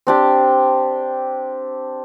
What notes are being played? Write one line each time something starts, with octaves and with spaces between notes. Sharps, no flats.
C4 D4 G4